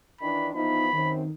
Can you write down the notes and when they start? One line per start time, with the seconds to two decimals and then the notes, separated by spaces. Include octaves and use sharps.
0.21 D#3 E3 D4 B5
0.54 E3 F3 B3 D#4 B5
0.93 F#2 D#3 C4